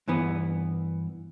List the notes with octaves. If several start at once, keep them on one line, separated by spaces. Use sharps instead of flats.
G2 E3 B3